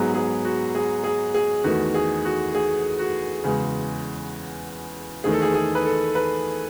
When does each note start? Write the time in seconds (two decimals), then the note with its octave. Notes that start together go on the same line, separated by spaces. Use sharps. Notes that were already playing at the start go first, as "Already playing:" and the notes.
Already playing: G#2 F#3 B3 G#4
0.14 G#4
0.45 F#4
0.75 G#4
1.04 G#4
1.34 G#4
1.64 E2 D#3 A3 F#4
1.94 G#4
2.25 F#4
2.55 G#4
2.99 F#4
3.44 E2 C#3 G#3
5.24 E2 D#3 A3 G#4
5.33 A4
5.42 G#4
5.54 G#4
5.75 B4
5.85 A4
6.15 B4